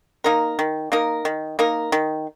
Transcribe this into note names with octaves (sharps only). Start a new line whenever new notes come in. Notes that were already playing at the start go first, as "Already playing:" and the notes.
A#3 D#4 A#4
D#3
A#3 D#4 A#4
D#3
A#3 D#4 A#4
D#3